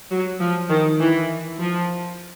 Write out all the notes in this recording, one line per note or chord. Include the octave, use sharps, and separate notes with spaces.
F#3
F3
D#3
E3
F3